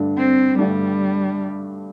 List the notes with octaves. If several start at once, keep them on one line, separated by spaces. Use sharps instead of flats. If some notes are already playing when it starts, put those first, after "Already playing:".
Already playing: G2 D3 A3 D4
C4
G2 D3 G3 A3 D4